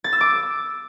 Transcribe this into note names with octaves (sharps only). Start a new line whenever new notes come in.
A6
E6
D6